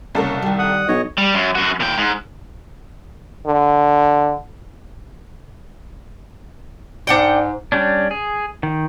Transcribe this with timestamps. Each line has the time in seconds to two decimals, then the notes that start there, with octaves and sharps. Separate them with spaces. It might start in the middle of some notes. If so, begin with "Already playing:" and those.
0.15 C2 C#3 A#3 A4 C#5
0.42 D#3 G3
0.59 F#5 D#6
0.88 B1 D4 C#5 D#5
1.18 G3
1.34 F#2
1.55 F#2 F#4
1.80 A#2 G5
1.97 G#2
3.47 D3
7.07 G#2 D4 F#5 G5
7.72 G3 C#4 D4
8.11 G#4
8.63 D#3